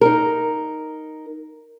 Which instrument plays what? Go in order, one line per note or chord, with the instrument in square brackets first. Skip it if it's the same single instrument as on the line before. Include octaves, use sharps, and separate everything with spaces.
[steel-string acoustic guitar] D#4 A#4